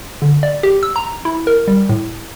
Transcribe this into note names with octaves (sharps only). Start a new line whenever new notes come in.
D3
D5
G4
E6
A#5
E4
A#4
G3
A2